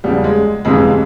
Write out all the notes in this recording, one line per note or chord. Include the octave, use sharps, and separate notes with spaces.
E2 C#3 F3 G3
G#3
G1 F2 C3 E3 G#3